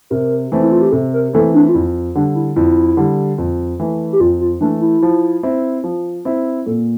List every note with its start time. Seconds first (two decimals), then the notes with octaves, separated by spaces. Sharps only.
0.10 C3 A#4
0.52 E3 A3 C4
0.62 E4
0.72 F4
0.82 G4
0.92 C3 A4
1.13 A#4
1.33 E3 A3 C4 A4
1.54 D4
1.68 F4
1.74 F2 E4
2.15 D3 G3 D4
2.35 E4
2.56 F2 E4
2.97 D3 G3
3.38 F2
3.80 E3 A3
4.12 G4
4.20 F2 F4
4.41 F4
4.60 E3 A3 D4
4.81 E4
5.02 F3
5.43 C4 E4
5.84 F3
6.25 C4 E4
6.66 A#2 A4